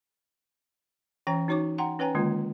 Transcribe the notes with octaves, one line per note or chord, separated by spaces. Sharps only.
E3 C#4 C#5 G5 A#5
D#4 F#4 C#5 C#6 D6
F#5 G5 A#5 C6
C#4 B4 C#5 G5 G#5 A#5
D3 D#3 G#3 A#3 F4